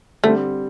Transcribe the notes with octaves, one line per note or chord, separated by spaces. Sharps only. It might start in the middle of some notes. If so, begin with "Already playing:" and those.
D3 G3 A3 C4